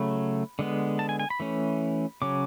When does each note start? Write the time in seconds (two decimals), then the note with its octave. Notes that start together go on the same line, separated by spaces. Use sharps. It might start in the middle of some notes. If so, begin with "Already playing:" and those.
Already playing: C#3 F#3 A3 B5
0.59 D3 G#3 B3
0.99 A5
1.09 G#5
1.20 G#5
1.30 B5
1.40 E3 A3 C#4
2.22 C#3 F#3 C#4 D6